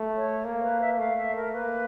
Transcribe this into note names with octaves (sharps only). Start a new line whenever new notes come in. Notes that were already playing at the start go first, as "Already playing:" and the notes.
Already playing: A3
C#5
A#3
B4
E5
E5
A3 F5
E5
A#4
A#3 B4